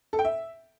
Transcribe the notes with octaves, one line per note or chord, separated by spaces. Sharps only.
A4
G5
E5